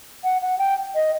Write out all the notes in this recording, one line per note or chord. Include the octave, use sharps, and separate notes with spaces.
F#5
F#5
G5
D#5